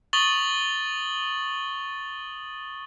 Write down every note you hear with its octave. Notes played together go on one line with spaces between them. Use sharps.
C#6 D#6 A6 F#7 G7